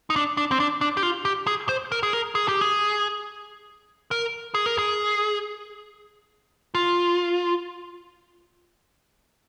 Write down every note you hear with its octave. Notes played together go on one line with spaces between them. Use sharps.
D#4
D4
D4
C4
D4
D4
G4
F4
G4
G#4
C5
A#4
G#4
A#4
G#4
G4
G#4
A#4
G#4
A#4
G#4
F4